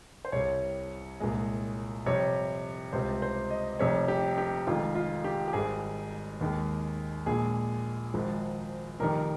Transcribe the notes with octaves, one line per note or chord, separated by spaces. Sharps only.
C5
C2 C3 G3 C#5
C2 A#2 G#3
F2 C3 G3 C#5
C#2 C3 G3 C5
C5
D#5
F1 F2 C3 G3 C#5
G4
G4
F1 F2 D#3 G#3 F4
F4
G4
G4
G#1 G#2 G3 G#4
D#2 D#3 G#3
A#1 A#2 G#3 G#4
G#1 G#2 F3
F1 F2 D#3 G3 A#4